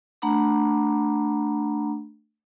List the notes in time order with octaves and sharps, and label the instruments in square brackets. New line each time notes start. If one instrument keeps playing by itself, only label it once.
[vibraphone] A3 D4 F#5 A#5 B5 D6